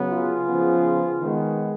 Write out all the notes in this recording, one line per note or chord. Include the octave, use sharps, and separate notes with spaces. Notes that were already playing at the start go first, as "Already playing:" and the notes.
Already playing: C#3 F#3 B3
F4 G#4
C#3 F3 B3
D#3 G#3 B3